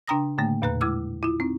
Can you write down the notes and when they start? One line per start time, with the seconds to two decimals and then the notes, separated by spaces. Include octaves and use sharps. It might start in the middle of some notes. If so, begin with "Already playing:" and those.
0.08 C#3 D4 G5 A#5 D#6 A#6
0.38 A2 D3 A3 A#3
0.62 E2 A#2 B4 A#5 F#6
0.81 G#3 E4 D6 E6 F6
1.23 E4 F4
1.40 C4 D#4